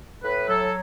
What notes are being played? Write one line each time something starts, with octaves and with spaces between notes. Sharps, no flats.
A2 B4
F#3 A4